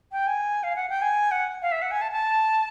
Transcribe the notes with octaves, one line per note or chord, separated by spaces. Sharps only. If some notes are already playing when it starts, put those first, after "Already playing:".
G5
G#5
F5
F#5
G5
G#5
F#5
F5
E5
F#5
G#5
A5
A5